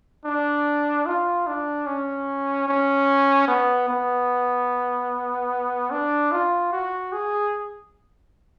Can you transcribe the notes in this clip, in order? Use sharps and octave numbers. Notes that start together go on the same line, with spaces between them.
D4
F4
D4
C#4
C#4
B3
B3
D4
F4
F#4
G#4